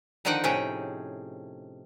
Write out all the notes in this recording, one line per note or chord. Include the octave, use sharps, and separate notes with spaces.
D3 D#3 F3 D#4 F#5 G5
A2 C3 C#4 G#4 G5